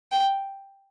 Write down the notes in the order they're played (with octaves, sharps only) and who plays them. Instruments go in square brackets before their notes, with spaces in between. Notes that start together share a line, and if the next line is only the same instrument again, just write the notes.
[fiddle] G5